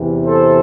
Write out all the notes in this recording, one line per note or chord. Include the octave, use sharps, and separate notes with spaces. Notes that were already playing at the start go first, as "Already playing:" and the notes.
Already playing: E2 C3 E3
A4 C5